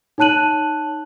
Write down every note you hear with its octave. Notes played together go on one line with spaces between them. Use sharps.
D#4 C#5 A5 F#6 D#7 F#7